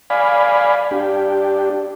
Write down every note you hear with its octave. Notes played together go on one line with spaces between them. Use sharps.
D5 F5 G#5 B5
D4 G4